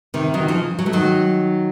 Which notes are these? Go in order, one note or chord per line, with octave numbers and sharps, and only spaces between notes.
C3 D#3
D#3 F#3
C#3 F3
F#3
A3
D#3 F#3